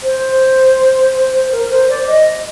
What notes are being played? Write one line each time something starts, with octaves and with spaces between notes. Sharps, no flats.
C5
A#4
C5
D5
D#5